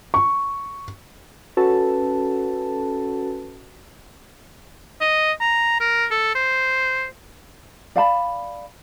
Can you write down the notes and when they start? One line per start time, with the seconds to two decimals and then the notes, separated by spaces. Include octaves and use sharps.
0.14 C#6
1.57 C#4 F#4 A4 B4 A5
5.01 D#5
5.40 A#5
5.80 A#4
6.11 A4
6.35 C5
7.96 D5 F5 A5 B5